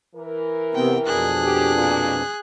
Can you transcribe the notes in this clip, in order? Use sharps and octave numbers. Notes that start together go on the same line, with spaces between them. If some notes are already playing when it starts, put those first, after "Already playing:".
E3 A#4
C3 B3 C4 G5
F2 B2 D4 G#4 F#6
G4
A#2